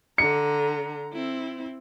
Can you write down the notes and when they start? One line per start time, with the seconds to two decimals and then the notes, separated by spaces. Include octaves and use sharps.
0.18 D3 A#5 C#7
1.13 C4 E4